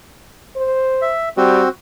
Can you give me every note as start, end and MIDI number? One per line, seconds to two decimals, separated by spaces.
0.56 1.14 72
1.02 1.29 76
1.37 1.62 55
1.37 1.69 60
1.37 1.69 66